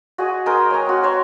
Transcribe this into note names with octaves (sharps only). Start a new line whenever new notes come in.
F#4 G#4 D#5
G#3 A#4 G5
C#5 G#5 A#5
C4 F#4
C5 C#5 A#5